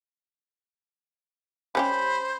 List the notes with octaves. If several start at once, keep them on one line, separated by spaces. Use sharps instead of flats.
G3 C#4 G4 C5 B5